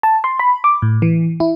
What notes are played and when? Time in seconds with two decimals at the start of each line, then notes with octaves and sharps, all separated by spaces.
0.03 A5
0.24 C6
0.39 B5
0.64 D6
0.82 A2
1.02 E3
1.40 E4